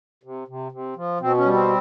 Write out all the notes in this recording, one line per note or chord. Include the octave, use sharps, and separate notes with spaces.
C3
C3
C3
F3
B2 C4
C#4
G3
C4